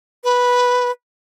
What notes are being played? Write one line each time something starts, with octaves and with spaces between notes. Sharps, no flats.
B4